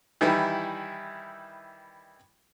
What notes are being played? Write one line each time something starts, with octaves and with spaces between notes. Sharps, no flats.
D#3 E3 G3 E4